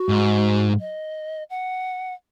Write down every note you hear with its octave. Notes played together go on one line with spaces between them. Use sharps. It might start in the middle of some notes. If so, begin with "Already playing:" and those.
Already playing: F#4
G#2
D#5
F#5